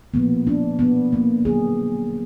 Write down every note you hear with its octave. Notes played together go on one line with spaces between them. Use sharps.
A#2 F3 A#3 B3
D4
B3
A#3
D3 F#3 A#3 G#4